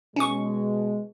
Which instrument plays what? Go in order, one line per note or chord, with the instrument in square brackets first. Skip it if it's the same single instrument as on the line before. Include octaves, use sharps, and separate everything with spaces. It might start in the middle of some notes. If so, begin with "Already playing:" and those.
[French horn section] B2 G#3 [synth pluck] C#4 C#6